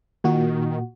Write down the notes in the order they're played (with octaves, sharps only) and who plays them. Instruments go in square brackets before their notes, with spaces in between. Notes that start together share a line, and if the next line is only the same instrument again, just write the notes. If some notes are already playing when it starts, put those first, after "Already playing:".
[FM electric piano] A#2 F#4 [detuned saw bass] D#3